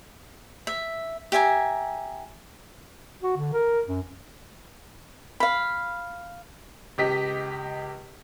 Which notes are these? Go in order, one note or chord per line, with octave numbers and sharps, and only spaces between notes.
E5
G4 E5 G#5 A#5
F#4
D3
A#4
F#2
F5 B5
C#2 G4 D#5 B6